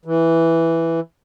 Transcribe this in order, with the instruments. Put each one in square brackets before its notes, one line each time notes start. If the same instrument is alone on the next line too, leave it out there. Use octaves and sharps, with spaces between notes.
[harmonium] E3